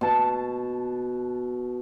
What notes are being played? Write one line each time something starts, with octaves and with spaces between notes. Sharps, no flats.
B2 A5